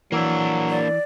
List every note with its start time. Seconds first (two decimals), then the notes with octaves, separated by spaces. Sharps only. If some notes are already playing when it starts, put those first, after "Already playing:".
0.12 E3 F#3 A#3 D4
0.70 D5